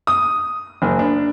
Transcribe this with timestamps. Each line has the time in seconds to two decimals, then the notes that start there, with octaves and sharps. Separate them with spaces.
0.07 D#6
0.82 F#1
0.99 D4